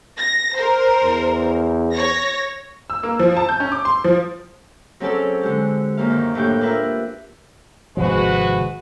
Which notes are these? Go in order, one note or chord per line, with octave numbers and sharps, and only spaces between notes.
A#6
A#4 C5
E2
C#5 A#6
E6
A#3
F3
A5
G6
C#4
D6
C6
F3
F#3 C4 C#4 G#4 A4 D5
D3 G#3 G4
F#2 A#3 F5
D#3
A2 A3 A#3 D4 G4 G5
D4 F4 A#4 B4 E5
G#1 C3 F3 G#3 F#4 B4